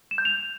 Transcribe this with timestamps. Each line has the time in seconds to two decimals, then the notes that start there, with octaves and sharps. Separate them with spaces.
0.11 E7
0.18 G6
0.25 F7